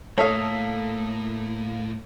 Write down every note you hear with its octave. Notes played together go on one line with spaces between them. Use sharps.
A2 A#3 A4 C#5 E5 F5 D#6